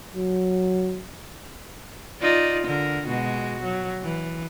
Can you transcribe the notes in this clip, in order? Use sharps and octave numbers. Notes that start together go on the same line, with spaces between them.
F#3
D#4 F4 D5
D3 A#4
B2 G#3 F#4
F#3
E3